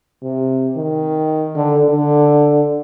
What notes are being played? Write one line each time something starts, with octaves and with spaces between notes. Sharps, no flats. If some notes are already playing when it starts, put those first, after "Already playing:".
C3
D#3
D3
D3